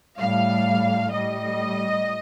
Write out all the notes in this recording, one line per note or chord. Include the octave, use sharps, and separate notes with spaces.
A2 G3 F5
A2 G3 D#5